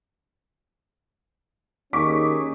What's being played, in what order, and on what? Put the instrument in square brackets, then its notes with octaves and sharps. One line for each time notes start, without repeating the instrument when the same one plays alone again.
[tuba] D#2 [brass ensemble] C#4 D#4 G#4 [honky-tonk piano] C#6 D6 B6